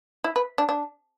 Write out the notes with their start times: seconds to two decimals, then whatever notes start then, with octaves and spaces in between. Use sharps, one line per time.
0.24 E4
0.36 B4
0.58 D4
0.69 D4